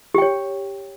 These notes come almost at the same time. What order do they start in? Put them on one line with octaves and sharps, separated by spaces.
G4 G5 C#5